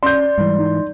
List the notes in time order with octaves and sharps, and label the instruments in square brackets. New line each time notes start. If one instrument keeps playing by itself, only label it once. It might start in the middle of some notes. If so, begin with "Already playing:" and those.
[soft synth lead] C#4 [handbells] D5 [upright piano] C6 G6
[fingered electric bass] G#2 E3 [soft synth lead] G3
[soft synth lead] D#4